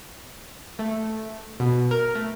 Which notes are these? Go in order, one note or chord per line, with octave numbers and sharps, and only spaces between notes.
A3
B2
A#4
A3